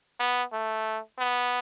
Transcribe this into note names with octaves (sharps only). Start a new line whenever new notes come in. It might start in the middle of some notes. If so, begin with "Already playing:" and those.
B3
A3
B3